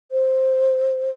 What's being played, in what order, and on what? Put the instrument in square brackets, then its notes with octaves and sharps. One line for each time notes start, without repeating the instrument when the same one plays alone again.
[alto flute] C5